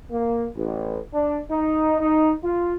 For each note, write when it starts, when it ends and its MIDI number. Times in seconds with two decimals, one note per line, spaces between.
0.11 0.47 58
0.56 0.98 33
1.14 1.39 62
1.51 1.95 63
2.00 2.32 63
2.44 2.76 65